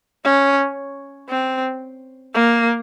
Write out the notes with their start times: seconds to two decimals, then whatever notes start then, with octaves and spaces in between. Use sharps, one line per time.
0.24 C#4
1.29 C4
2.34 A#3